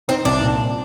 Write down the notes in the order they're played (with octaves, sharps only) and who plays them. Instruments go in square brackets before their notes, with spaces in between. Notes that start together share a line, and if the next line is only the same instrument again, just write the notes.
[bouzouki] C4 [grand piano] D#4
[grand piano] C2 [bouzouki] D4
[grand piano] A#2